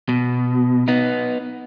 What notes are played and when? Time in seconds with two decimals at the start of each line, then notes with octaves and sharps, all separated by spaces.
0.09 B2
0.88 B3 D#4